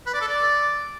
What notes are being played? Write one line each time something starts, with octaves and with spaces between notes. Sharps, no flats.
B4
D5
A4
D5